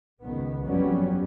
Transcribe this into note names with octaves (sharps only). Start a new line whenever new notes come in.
C#2 D#3 B3
G1 F2 F#3 G3 B3 C#4